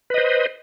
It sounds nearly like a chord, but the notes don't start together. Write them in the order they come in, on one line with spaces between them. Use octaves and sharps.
B4 D#5 C5